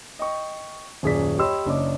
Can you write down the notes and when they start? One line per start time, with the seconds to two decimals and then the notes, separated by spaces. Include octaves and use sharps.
0.19 D#5 G5 C#6
1.03 D#1 F#2 G#4 D5 B6
1.39 G4 C#5 D#5 B5 C6 E6
1.65 F#1 C#4 D4 D#5 D6